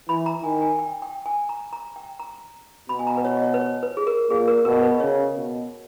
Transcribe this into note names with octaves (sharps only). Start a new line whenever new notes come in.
E3 B5
A#5
D#3 G#5
G#5
G5
G5
G#5
A#5
A#5
G5
A#5
B2 B5
G#5
A#5
B4
C#5
D#5
C#5
B4
C#5
B4
G#4
A#4
A#2 G#4
A#4
B2 A#4
B4
D#5
C#3 C#5
B2